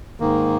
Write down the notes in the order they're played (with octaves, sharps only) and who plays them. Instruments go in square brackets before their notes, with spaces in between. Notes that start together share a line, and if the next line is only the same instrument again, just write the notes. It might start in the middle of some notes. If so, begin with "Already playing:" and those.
[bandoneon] G#2 D#3 A#3